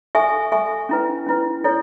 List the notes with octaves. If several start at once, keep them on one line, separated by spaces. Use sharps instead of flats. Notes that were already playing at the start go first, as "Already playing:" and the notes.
A4 E5 G#5 C#6
A4 E5 G#5 C#6
C#4 E4 B4
C#4 E4 B4
E4 A4 C#5